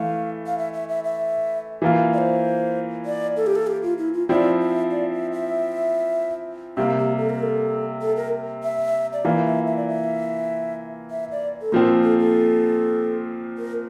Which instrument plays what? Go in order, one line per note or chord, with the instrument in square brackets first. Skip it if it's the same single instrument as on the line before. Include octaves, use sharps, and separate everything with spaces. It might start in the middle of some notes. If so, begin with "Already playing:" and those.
Already playing: [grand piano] E3 A3 E4 [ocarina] F5
[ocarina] F5
E5
E5
E5
E5
[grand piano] E3 A#3 F4
[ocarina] D5
C5
D5
A4
G4
A4
G4
F4
E4
F4
[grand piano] F3 C4 E4 [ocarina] D5
[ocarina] E5
D5
E5
E5
[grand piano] C3 G3 A#3 [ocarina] F5
[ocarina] G4
A4
A#4
A4
A4
A#4
E5
D5
[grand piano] E3 A#3 F4 [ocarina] E5
[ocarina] E5
E5
D5
E5
E5
D5
A4
[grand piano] A#2 F3 C4 [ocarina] A#4
[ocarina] A4
A4
A#4